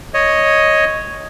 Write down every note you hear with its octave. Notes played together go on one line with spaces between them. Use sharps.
C#5 D#5